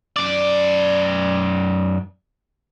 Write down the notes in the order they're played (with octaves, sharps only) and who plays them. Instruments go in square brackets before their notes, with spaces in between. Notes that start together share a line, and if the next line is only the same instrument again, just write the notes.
[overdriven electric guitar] F#2 D5